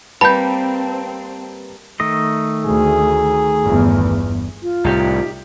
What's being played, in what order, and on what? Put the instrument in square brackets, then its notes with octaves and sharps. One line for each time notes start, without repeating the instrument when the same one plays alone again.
[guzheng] G3 A#3 [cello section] C4 [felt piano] B4 A5 [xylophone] B5 G6
[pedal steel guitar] D#3 A3 D#5
[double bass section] D2 [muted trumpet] G#4
[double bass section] G1 E2 G2
[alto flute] F4
[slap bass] C2 A2 [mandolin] D#4 G4 D5